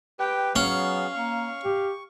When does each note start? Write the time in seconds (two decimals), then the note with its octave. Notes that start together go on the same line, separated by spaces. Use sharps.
0.19 G4 B4 G5
0.56 F#3 B3 C#4 F#4 G#4 F5
1.16 A#3 C#6
1.64 G4